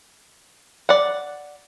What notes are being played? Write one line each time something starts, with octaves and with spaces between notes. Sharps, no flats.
D5 F#5